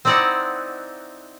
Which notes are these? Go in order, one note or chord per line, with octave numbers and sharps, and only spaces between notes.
C4 D#4 E4 D5 D#5 F#5